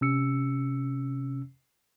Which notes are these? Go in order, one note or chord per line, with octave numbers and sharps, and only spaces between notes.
C3 C#4 E6 C#7